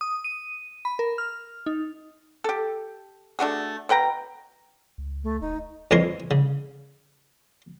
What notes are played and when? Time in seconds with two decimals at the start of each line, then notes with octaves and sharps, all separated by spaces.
0.01 D#6
0.24 D#7
0.85 B5
0.99 A#4
1.18 F6
1.66 D#4
2.44 G4 A4
3.39 A3 D4 F#4 G#4
3.89 B2 B4 G5 A#5
4.98 C#2
5.24 A3
5.41 D#1 D#4
5.91 F2 E3 C#4 E4 A#4 C6
6.31 C#3